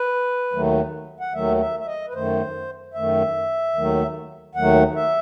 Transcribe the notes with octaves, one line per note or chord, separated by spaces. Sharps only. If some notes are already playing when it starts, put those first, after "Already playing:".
Already playing: B4
D#2 D#3 F#3 A3
F#5
D#2 D#3 F#3 A3 E5
E5
E5
D#5
B4
F#2 D#3 A3 C5
F#2 D#3 A3 E5
D#2 D#3 F#3 A3
D#2 D#3 F#3 A3 F#5
E5